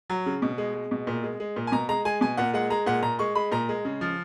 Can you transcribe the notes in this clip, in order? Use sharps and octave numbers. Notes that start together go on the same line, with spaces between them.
F#3
C#3
B2
G#3
G#3
B2
A#2
G#3
G#3
A#2
G#5
B2 A#5
G#3 A#5
G#3 G#5
B2 G#5
A#2 F#5
G#3 F#5
G#3 A#5
A#2 F#5
A#2 A#5
G#3 C#6
G#3 B5
A#2 A#5
G#3
C#3
F3